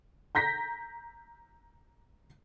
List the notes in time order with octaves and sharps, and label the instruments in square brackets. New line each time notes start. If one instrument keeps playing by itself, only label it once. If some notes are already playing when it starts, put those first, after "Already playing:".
[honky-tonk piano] A#5 G6 A#6 B6